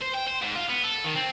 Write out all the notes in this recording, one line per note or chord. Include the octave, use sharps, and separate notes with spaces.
C5
G5
C5
G#2
F4
B3
A4
D#3
C4